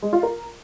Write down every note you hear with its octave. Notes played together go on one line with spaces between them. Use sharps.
G#3
F4
A#4